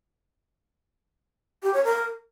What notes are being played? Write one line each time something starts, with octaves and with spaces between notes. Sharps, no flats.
G4
C#5
A#4